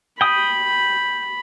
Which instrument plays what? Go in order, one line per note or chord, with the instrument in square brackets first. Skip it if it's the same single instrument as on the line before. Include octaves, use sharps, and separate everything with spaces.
[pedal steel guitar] G5 D#6 [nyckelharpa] B5